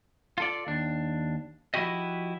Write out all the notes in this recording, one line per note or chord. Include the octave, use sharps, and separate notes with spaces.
F4 A4 D5
D#2 D4
F3 E4 F#4 G4 D#5